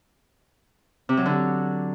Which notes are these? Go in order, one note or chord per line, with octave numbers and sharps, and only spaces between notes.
C3
F#3
D3